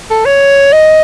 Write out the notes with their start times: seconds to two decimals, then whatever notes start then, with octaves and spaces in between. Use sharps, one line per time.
0.10 A4
0.25 C#5
0.73 D#5